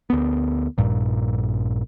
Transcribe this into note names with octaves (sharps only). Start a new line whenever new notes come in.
D2 B3
A#1 G2 A#2